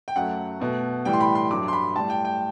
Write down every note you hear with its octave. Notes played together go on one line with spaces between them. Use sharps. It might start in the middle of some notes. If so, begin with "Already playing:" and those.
G5
F#2 F#3 A3 F#5
B2 A3
A2 E3 G3 G5
C6
B5
C6
G2 F#3 A3 D6
C6
B5
A2 G3 A5
G5
G5